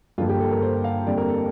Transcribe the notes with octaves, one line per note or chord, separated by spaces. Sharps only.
G2 D3 F3 A#3 F4
G4
A4
A#4
C5
F5
F2 D3 G3 A#3 D5
A#4
A4